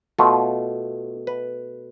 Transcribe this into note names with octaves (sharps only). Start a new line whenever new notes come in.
B2 A3 F4
B4